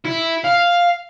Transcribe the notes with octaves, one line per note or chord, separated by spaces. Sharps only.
E4
F5